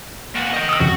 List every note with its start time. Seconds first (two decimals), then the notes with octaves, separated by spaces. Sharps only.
0.35 A#2 F#4
0.54 D#5 G5
0.69 D#6 E6
0.80 C2 F2 F#4